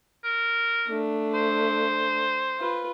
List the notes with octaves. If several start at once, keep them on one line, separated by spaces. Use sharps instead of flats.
A#4
A3 D4
C5
F4 B4